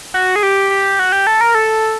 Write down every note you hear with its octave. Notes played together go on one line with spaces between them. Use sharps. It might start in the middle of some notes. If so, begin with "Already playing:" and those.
F#4
G#4
G4
G4
F#4
G4
A4
A#4
A4